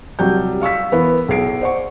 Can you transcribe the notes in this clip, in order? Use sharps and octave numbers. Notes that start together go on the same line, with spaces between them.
C2 F#3 G3 G6
F5 C#6 E6 B6
E3 B3 E4 A#4
B1 G#4 C7 D7
C5 D5 F#5 C#6